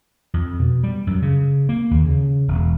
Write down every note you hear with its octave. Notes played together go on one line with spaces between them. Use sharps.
F2
B2
G3
F#2
C#3
A#3
D#2
C#3
E1